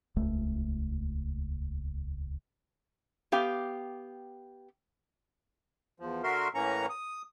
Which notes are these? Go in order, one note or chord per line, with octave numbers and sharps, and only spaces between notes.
D#1 C#2 A3
B3 G4 F5 G5
E2 F3
D3 F#4 A#4 E5 C6
A2 E3 A#3 C#4 A#5 C#6
D#6